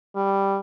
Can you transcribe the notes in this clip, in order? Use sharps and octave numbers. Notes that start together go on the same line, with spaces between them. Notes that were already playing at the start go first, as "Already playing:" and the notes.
G3